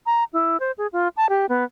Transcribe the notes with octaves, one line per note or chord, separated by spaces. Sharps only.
A#5
E4
C5
G#4
F4
A5
G4
B3